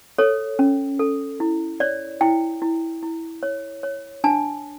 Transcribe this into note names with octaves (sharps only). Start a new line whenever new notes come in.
A4 C#5
C#4
A4
E4
C#5 D5
E4 G5
E4
E4
C#5
C#5
D4 A5